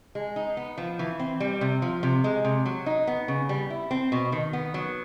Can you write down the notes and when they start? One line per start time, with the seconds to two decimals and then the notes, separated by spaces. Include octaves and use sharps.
0.15 G#3
0.36 D#4
0.57 B3
0.78 F3
0.99 E3
1.19 C4
1.40 G3
1.61 C3
1.82 F3
2.03 C3
2.24 G#3
2.45 C3
2.66 F#3
2.86 D#4
3.07 B3
3.28 C#3
3.49 G3
3.70 E4
3.91 C4
4.12 B2
4.32 D#3
4.53 B3
4.74 F#3